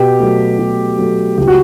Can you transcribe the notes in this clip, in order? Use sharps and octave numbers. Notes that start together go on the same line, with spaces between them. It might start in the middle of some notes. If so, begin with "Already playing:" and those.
Already playing: B2 G4
F#3 A3
B2
F#3 A3
C#2 G4
F#4